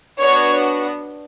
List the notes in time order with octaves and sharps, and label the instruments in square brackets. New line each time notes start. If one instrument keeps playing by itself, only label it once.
[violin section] B3 D4 F#4 C#5